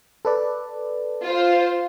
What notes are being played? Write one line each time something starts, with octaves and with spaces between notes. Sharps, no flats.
A4 B4 D5
F4 C5